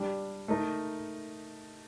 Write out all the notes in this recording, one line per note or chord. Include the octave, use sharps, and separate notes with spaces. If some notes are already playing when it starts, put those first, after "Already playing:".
Already playing: G3 D4 G4
A3 D#4 A#4